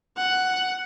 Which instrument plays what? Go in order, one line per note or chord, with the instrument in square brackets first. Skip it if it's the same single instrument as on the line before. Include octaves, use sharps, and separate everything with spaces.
[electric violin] F#5